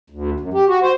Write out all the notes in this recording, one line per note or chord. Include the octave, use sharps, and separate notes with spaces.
D2
F#2
G4
F#4
C5